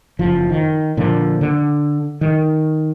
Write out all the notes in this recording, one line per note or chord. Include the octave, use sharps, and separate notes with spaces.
F#1 F3
D#3
A#2 D3 F3
D3
D#3